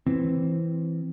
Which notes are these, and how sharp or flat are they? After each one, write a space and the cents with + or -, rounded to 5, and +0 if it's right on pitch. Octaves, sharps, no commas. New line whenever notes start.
E3 +0 C4 +0